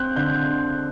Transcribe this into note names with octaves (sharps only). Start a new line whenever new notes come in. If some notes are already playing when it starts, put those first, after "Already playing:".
Already playing: C4 F#6 G6
D3 G6